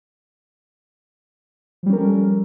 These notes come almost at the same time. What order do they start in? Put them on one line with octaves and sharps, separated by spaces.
F3 G3 C#4 A#4 A4